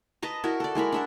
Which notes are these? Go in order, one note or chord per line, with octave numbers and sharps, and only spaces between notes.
B4 D#5 A5 A#5
E4 F#4 A#4
A4 D5
G#3 E4 A#4 B5
D4 E5 F#5